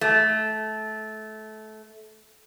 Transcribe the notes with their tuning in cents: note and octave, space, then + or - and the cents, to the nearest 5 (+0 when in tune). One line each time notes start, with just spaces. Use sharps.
A3 -20